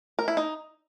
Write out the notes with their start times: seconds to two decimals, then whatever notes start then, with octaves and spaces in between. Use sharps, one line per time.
0.19 A#4
0.28 E4
0.37 D#4